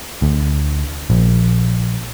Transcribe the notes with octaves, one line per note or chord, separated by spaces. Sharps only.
D2
A#1